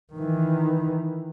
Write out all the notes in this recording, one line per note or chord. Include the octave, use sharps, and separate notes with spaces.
D#3 E3